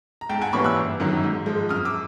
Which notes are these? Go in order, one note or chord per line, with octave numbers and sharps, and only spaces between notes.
A#5
G#2 G5 A5
F#5 G#5
E3 G3 A#3 C#4 B5 C#6
E6 F#6
G1
F#2 D#3 F#3
G#2
F3 G#3
F#2 D#6 F6
D6 E6